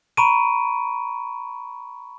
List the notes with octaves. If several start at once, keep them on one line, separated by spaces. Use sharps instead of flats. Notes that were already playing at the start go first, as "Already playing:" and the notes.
A#5 B5 C#6 D7 D#7